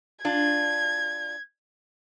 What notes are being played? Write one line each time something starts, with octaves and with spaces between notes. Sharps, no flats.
D4 F4 G#6